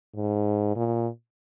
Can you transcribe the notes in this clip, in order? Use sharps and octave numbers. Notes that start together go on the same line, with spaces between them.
G#2
A#2